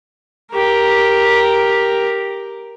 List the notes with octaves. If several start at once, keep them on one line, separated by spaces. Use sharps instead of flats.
G4 A#4